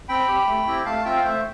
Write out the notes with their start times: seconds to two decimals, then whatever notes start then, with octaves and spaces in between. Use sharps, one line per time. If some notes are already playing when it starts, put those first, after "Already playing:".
0.09 C4 G5 B5
0.28 G4
0.47 A3
0.66 C4 E4 G4
0.85 A3 F5 A5
1.05 C4 F4 E5 G5
1.16 F5
1.24 A3 C5 E5